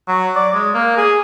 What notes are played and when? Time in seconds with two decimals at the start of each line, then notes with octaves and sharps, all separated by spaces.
0.08 F#3
0.35 D5
0.54 G#3
0.75 A#3
0.97 G#4